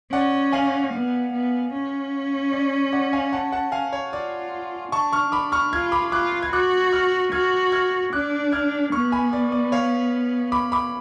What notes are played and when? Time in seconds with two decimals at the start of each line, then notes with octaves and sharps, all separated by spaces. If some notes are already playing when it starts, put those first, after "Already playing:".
0.12 C#4 D5 F#5
0.52 F5 G#5
0.93 B3
1.33 B3
1.73 C#4
2.52 D5
2.93 D5 F#5
3.13 F5 G#5
3.33 F#5 A5
3.52 F#5 A5
3.72 F5 G#5
3.93 C#5
4.12 F4 D5
4.92 D4 A5 C#6
5.13 C#6 F6
5.32 B5 D6
5.52 C#6 F6
5.73 F4 F6 G#6
5.92 B5 D6
6.12 F4 D6 F#6
6.43 G#6
6.52 F#4 D6 F#6
6.92 C#6 F6
7.32 F#4 F6 G#6
7.72 F6 G#6
8.13 D4 D6 F#6
8.52 F6 G#6
8.92 B3 C#6 F6
9.12 G#5 B5
9.33 D5
9.52 D5
9.72 C#5 F5
10.52 B5 D6
10.72 B5 D6